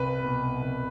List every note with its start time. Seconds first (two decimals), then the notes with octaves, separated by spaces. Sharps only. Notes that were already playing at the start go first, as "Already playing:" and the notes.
Already playing: C2 B4
0.24 B2
0.62 C2